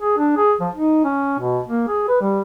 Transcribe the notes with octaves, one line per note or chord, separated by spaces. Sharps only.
G#4
D4
G#4
F3
D#4
C#4
B2
A#3
G#4
B4
G3